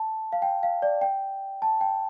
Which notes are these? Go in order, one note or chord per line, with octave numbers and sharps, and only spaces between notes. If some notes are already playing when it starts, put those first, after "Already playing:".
Already playing: A5
F5
G5
F5
D5
G5
A5
G5